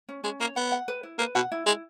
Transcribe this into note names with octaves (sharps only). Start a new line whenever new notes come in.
C#4
G#3 C#4
A#3 C#5
B3 F#5
F#5
B4
E4
A#3 B4
B2 F#5
E4
G#3 E4